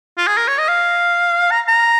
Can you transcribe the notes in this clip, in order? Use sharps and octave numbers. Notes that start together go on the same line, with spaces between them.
F4
G#4
A#4
C#5
D#5
F5
A#5
A#5